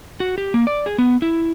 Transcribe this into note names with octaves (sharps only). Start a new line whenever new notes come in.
F#4
G4
A#3
D5
G#4
B3
E4